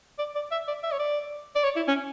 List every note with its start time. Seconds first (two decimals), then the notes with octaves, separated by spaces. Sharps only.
0.19 D5
0.35 D5
0.52 E5
0.67 D5
0.83 E5
0.92 C#5
0.99 D5
1.55 D5
1.64 C#5
1.76 E4
1.88 C#4